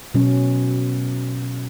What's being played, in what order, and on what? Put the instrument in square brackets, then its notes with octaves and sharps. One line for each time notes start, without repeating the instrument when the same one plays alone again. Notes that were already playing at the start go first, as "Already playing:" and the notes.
[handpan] B2 F#3 C#4